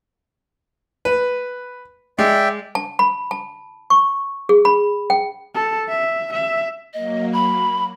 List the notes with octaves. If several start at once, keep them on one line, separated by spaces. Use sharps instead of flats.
B4
G#3 D5 E5 G5
A5
B5
A5
C#6
G#4
B5
G5
A4
E5
E5
F#3 A#3 D#5
B5